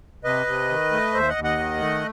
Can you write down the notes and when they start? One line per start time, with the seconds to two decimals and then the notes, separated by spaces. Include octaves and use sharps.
0.24 C3 B4 D#5
0.46 C3
0.69 D#3
0.92 A3
1.14 D#2 C5 E5
1.29 D#5 F#5
1.36 D#2
1.44 D#5 F#5
1.59 D#3
1.81 A3